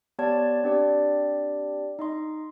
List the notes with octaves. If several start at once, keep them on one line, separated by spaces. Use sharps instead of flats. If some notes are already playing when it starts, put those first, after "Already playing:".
B3 G4 C#5 D5 A5 G#6
C4 D4 G4 D5
D#4 D#5 C6